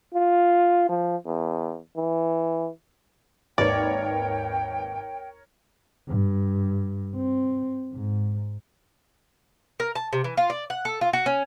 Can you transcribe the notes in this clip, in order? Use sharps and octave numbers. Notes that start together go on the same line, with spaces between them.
F4
F3
E2
E3
G#1 D#2 A#4 B4 C#5 D5 G5
G2
C4
G#2
A#4
A5
C3
E3
F4
D5
F#5
A4
F4
F#4
C#4